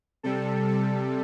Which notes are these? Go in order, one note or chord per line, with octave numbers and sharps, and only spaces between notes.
C3 G3 A4
A4